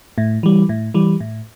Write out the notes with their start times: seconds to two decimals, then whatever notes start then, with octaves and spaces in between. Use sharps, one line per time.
0.18 A2
0.43 E3 G3
0.69 A2
0.94 E3 G3
1.20 A2